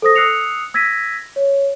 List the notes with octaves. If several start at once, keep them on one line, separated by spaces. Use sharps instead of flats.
A4 C5 D#6 A#6
D#6 E6 F#6 C7 C#7 F7
E6 G#6 A#6 B6 D#7
C#5